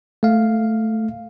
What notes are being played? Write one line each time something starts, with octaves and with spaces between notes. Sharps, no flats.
A3 F5